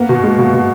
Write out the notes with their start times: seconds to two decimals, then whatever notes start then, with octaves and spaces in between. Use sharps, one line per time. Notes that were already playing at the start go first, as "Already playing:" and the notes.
Already playing: A#3 B3
0.09 B2
0.24 G#3
0.38 B2
0.53 B2